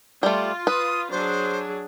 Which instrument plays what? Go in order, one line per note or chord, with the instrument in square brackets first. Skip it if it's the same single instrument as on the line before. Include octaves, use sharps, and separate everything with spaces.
[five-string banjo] G3 A3 [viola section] F4
[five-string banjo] B4 [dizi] D#6
[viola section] F#3 D4 G#4 [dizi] C5